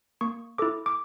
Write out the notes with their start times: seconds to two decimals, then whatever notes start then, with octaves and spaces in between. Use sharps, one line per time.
0.21 A#3 C#6
0.58 E4 A4 D6
0.86 D6